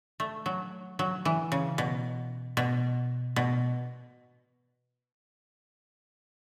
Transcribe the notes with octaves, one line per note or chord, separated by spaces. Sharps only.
A3
F#3
F#3
E3
C#3
B2
B2
B2